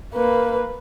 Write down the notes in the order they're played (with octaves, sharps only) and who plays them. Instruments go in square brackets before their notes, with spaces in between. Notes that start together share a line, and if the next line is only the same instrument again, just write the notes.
[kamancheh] A#3 B4